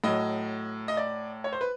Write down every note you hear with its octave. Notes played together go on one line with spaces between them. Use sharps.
A2 F#3 D#5
D#5
D5
C#5
C5
B4